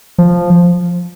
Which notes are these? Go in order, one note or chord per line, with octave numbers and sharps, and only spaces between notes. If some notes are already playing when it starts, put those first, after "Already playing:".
F3